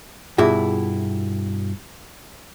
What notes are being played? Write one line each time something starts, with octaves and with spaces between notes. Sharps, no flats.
G2 B2 E4 F4 G#4